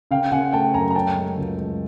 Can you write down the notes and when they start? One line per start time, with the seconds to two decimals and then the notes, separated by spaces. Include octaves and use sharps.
0.11 C#3 F5 G5
0.32 C#3 F#5 G#5
0.52 A3 G5 A5
0.74 F#2 G#5 A#5
0.90 A#5
0.95 C#4 G5 A5
1.16 G#3
1.37 C#2
1.58 G#3